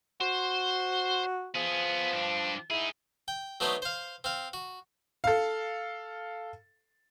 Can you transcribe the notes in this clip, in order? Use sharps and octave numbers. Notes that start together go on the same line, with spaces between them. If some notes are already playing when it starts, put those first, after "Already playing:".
F#4 C5
F3 B3 G#4
G2 D4
D#4 E4 G#4
G5
F#3 A3 B3 D4 D#4 C5
C5 F5
C4 F5
F#4
A4 F5